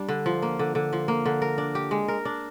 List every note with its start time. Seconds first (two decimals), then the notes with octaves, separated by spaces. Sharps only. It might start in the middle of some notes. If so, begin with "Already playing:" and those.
Already playing: G3 D4
0.09 D3
0.26 F3
0.42 A#3
0.59 D3
0.75 D3
0.93 F3
1.08 A#3
1.25 D3
1.42 A#4
1.58 D4
1.75 G4
1.91 G#3
2.08 A#4
2.25 D4